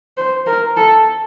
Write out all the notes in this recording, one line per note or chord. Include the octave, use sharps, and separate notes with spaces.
C5
A#4
A4